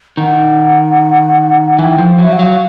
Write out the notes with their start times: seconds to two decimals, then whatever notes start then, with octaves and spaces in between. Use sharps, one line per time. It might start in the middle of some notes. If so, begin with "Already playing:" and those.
0.17 D#3 F#5
1.79 E3 G#5
1.82 G5
1.98 F3
2.19 F#3 E5
2.32 F#5
2.37 F#3 F5